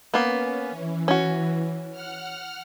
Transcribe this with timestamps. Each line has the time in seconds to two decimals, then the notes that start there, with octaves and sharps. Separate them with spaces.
0.14 A#3 B3 C#4
0.69 E3
1.08 C#4 F#4
1.92 F#5 F6